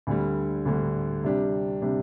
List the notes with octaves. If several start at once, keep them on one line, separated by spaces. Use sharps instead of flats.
D2 D3 G3
D2 D3 G3
C3 G3 D4 G4
C3 G3 D4 G4